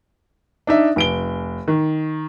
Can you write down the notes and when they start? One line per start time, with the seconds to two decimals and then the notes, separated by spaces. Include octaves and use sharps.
0.67 D4 D#4 E5
0.96 F1 D7 G7
1.68 D#3